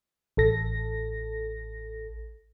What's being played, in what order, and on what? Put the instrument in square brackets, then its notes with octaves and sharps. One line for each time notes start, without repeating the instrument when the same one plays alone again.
[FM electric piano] A1 A4 A#6